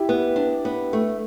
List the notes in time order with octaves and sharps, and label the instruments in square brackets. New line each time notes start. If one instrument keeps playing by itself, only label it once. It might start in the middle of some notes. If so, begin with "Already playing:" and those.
Already playing: [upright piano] E4 G4
[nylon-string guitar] B3
D4
B3
A3